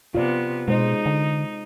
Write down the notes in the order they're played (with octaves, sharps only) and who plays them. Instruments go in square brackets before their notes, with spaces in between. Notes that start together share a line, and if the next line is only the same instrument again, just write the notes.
[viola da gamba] C3 B3 [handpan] F4 D5
[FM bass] B2 [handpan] G#3 C5 [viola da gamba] D#4
[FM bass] D3